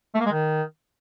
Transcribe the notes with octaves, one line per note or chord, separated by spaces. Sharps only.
A3
A#3
G#3
D#3